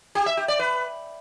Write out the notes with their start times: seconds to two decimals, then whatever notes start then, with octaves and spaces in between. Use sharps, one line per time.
0.15 G4
0.26 E5
0.37 G4
0.48 D5
0.59 B4